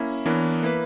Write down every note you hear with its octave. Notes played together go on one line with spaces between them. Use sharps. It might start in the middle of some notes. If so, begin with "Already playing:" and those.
Already playing: A#3 C#4 E4
E3 B3 D4 A#4 C#5
A#3 E4 B4